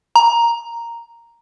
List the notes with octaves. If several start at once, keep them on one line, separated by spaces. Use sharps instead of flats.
A#5